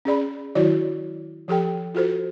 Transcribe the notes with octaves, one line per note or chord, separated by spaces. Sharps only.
C#4 G#4 D5 B5
D#3 F#3 E4 F#4 C#5 D5
F3 G4 A4 G5
F4 F#4 A4 C5